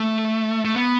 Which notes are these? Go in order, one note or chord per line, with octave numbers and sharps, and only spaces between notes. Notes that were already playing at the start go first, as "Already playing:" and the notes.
Already playing: A3
A3
B3